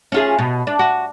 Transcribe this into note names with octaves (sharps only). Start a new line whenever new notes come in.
C#4 F4 G#4
B2
D4
F#4